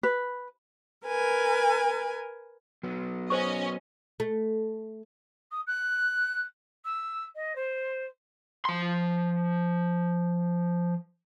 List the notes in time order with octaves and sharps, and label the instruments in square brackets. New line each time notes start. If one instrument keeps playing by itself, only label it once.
[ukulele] B4
[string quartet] A#4 B4 G#5
[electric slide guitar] F#3 B3
[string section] C#4 D#5 [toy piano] C5 C#6
[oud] A3
[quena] D#6
F#6
E6
D#5
C5
[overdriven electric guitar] F3 C6